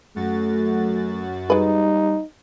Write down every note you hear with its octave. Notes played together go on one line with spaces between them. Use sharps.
F#2 A3 F#4 A6
G3 G#3 D#4 B4